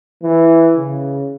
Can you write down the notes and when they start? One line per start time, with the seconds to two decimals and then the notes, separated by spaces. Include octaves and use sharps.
0.23 E3
0.77 C#3